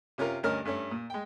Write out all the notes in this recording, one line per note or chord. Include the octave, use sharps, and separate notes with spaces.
C3 C#4 F4 A#4
D2 G2 C#4 A#4 D#5 F6
G2 A3 C#4
A#2
G#3 G5